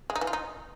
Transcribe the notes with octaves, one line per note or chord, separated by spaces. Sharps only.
G#3
D#4
E3
F4
D#4